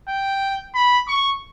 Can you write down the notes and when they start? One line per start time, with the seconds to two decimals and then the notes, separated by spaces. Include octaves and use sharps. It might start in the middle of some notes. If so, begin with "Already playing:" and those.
0.08 G5
0.75 B5
1.08 C#6